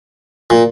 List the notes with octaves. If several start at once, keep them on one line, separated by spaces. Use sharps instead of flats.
A#2